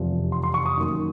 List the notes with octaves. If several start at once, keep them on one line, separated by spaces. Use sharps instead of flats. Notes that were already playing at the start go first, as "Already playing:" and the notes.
Already playing: F1 E2 C3 F3
C6
C6
C#6
D#6
F#2 D#3 F#3 A#3